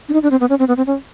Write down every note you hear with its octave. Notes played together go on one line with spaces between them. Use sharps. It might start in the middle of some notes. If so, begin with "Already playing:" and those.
D4
D#4
D4
C4
B3
C#4
C4
B3
C4
C#4